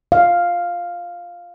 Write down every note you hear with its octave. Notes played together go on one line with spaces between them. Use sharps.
F5